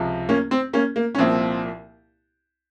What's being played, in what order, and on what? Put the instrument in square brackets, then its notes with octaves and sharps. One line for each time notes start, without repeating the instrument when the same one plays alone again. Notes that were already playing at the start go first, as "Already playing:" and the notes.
Already playing: [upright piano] C#2 C3 F3
A#3 C#4
C4
A#3 C#4
A#3
C#4
C2 A#2 F3 C4